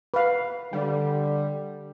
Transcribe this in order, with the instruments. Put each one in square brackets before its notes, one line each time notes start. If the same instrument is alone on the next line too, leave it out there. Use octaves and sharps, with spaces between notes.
[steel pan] B4 F5
[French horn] D3 [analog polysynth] G3